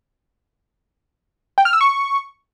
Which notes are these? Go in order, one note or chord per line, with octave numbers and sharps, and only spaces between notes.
G5
F6
E6
C#6